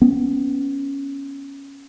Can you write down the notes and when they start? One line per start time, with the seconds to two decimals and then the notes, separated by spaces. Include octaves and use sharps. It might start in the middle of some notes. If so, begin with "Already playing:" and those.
0.02 B3 C#4